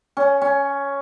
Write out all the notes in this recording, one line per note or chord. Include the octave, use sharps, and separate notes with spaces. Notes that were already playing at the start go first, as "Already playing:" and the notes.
C#4
C#4